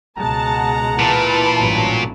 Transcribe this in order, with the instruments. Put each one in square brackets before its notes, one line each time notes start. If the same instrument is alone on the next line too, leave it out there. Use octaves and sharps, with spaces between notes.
[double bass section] C#2 B2 G#3 [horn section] F#5 A#5 [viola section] A5
[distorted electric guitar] A#2 [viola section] E3 A5 B5
[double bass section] A1 G2 [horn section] F#3